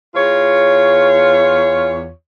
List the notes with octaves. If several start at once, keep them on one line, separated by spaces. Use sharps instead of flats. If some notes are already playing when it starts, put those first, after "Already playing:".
E2 F4 C#5